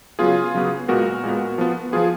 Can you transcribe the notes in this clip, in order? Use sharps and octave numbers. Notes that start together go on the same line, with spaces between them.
C#3 F#3 B3 F4 G#4
C#3 F#3 B3
A#2 G#3 B3 F#4 A#4
A#2 G#3 B3
F3 B3
F3 B3 F4 G#4